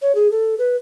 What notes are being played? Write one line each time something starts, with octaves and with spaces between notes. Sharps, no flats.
C#5
G#4
A4
B4